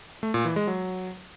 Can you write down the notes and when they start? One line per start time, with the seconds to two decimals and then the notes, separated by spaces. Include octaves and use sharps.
0.23 A3
0.34 A#2
0.45 E3
0.56 G#3
0.67 F#3